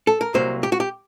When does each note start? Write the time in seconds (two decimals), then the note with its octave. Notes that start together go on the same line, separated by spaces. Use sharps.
0.07 A4
0.21 A#4
0.34 C2 C3 F#3 A#3 C5
0.63 G4
0.72 F#4
0.80 G4